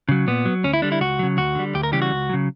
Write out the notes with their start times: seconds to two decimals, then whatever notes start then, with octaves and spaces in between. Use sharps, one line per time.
0.09 C#3 F#3
0.27 A#2 B3
0.45 F#3
0.64 D2 C#4
0.73 E4
0.82 D3 G3 D4
0.92 E4
1.01 C#2 F#4
1.19 C#3 F#3
1.37 D2 F#4
1.55 D3 G3
1.74 D2 G4
1.83 A#4
1.92 C#3 E3 G3 G4
2.02 F#4
2.11 C#2
2.30 C#3 F#3